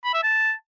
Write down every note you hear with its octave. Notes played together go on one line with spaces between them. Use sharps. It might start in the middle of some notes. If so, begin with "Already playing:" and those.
B5
E5
A5